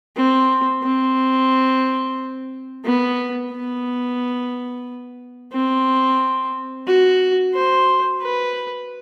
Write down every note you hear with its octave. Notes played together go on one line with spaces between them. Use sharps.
C4
C4
B3
B3
C4
F#4
C5
B4